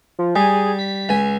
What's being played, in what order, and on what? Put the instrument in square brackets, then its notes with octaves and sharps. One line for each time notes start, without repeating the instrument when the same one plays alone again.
[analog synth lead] F3
[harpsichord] G3 [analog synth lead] G#4
[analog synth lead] B6
[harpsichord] C#2 G#5